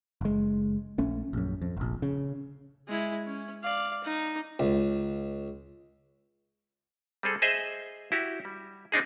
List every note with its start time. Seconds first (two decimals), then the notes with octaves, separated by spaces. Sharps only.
0.21 F#1 G#3
0.98 A#1 A3 C#4
1.33 A#1 F#2
1.62 F2
1.77 F1 A#1
2.02 C#3
2.88 G#3 E4
3.27 C#4
3.63 D5 F5
4.04 D#4
4.59 C#2
7.23 G3 C4 G#4 A4
7.42 G#4 C5 D#5 E5
8.12 E4 F#4 G4
8.45 G3
8.92 C4 D4 D#4 G#4